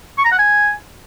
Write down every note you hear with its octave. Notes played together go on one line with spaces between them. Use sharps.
C#6
A#5
F#5
G#5